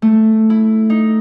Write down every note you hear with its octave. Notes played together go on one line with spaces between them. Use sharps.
A3
E4
D#4